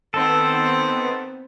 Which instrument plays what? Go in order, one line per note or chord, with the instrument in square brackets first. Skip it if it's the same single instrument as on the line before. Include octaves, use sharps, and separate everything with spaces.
[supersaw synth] D#3 B3 [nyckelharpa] C4 C5 [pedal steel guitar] A4